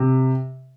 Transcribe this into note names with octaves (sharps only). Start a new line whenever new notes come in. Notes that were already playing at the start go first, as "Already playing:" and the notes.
Already playing: C3